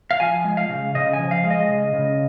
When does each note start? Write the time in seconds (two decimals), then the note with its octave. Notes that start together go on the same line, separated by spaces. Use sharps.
0.11 F5
0.20 F3 G#5
0.45 G#3
0.57 F5
0.70 C#3
0.95 C#3 D#5
1.13 G#5
1.19 F3
1.31 F5
1.44 G#3
1.50 D#5
1.69 C#3
1.93 C#3